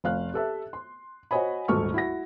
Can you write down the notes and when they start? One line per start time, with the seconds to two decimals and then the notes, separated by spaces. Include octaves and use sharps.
0.04 F1 F5 F#6
0.34 G4 A4 E5
0.73 C6
1.31 F#4 C5 C#5 D#5 G#5 B5
1.68 D#1 D2 G#2 A3 C#6 F6
1.94 E4 F#4 A#6